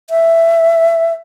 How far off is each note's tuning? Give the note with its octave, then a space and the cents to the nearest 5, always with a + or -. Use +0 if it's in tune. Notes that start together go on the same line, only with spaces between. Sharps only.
E5 +10